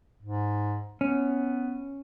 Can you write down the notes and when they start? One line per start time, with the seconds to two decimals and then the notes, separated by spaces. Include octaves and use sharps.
0.22 G#2
1.01 B3 C#4